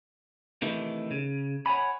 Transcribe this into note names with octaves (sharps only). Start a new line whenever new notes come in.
C3 D#3 E3 A3
C#3
C#5 F#5 G#5 B5